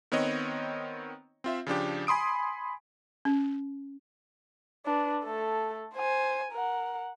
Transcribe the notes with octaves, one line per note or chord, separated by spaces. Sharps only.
D#3 B3 C4 C#5 D#5
C4 F4 E5
C#3 F3 D4 G4
G#5 B5 C6 D#6 D7
C#4
D4 B4
A3 A4
C5 G#5
A#4 F#5